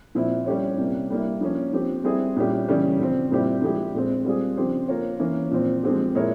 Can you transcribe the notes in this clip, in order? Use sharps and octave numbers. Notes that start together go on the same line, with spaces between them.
A#2 F3 C4 E4
G3 C#4 G4 C#5
C3 G3 A#3 C#4 E4
G3 A#3 E4
F3 A#3 C#4
F3 C4 G4
G3 C4 E4 G#4
A#2 G3 C#4 E4 G4
C#3 E3 G3 C#4
C#3 F3 C4
A#2 G3 C4 E4 G4
F3 G#3 E4 G4
A#2 G#3 C4
G3 C4 F4 G#4
C#3 F3 C4 G4 C5
A#3 F4 A#4 C#5
E3 A#3 C#4
A#2 F3 C4
F3 G#3 C4 G4
A#2 G#3 E4 A#4 C#5